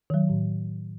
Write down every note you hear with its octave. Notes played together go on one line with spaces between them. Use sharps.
D#3 F#3
A2